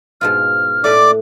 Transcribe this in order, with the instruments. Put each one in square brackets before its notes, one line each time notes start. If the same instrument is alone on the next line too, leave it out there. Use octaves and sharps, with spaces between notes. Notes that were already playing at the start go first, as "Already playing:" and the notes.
[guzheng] G#2 B2 F4 [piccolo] F6
[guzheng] A2 B4 [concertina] D5 D6